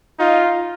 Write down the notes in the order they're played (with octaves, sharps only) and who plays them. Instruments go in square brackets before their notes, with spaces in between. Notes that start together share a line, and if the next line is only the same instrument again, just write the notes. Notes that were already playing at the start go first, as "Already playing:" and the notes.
[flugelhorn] D#4 [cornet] F4